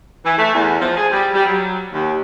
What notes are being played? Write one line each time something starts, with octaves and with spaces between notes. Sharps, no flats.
E3
A3
E2
F3
G#4
G3
G3
F#3
D#2